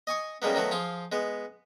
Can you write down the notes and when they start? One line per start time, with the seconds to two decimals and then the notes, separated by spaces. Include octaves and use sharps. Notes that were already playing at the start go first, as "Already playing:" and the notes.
0.07 D#5 G#5 C#6 D#6
0.42 C#3 G3 G#3 A#3 B3
0.55 D#3 F#3 A3 B3
0.71 F3 F4 G#4
1.12 G#3 B3